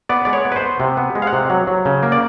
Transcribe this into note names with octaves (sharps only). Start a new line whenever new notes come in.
B3 D5
G#3 D5
C#5
B3
B4
C5
B3
C3
B3
G#3
F5
F#5
C3
F#3
F#3
C#3
A#3
D5